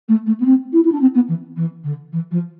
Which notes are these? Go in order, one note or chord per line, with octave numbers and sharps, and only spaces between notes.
A3
A3
B3
C4
E4
E4
D4
C4
B3
E3
E3
D3
E3
F3